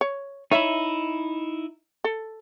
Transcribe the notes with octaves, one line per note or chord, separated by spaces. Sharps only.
C#5
D#4 E4 C#5 E5
A4